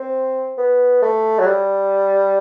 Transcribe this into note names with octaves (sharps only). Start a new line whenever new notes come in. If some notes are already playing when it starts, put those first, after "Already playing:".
Already playing: C4
B3
A3
F#3
G3